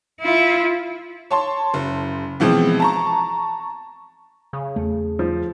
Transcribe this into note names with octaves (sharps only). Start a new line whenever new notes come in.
E4 F4
C#5 A5 C6
F#1
B2 E3 F3 G#3 C4
A5 A#5 C#6
C#3
E2 A3
F3